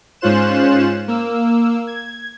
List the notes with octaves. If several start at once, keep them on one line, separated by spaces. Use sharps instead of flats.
G#2 C#4 F4 C5 F#6 E7
A#3 E6
G#6